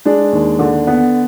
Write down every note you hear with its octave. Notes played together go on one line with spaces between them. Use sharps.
G#3 D4
D#2
D3
B3